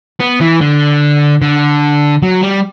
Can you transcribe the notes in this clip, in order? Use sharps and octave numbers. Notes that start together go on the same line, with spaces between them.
B3
E3
D3
D3
F#3
G3